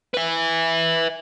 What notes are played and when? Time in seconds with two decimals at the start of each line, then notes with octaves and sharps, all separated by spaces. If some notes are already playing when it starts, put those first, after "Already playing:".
0.14 B4 E5